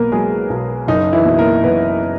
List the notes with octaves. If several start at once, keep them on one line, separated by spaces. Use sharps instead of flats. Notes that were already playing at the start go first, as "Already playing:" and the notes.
Already playing: B1 A#3 B3 A#4 B4
F#3 G#3 G#4
B1
F#1 D#4
E3 E4
B2
A#3 A#4
F#1 B3 B4